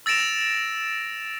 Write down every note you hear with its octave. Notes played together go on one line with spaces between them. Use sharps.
E6 A6 A#6 D7 E7 F7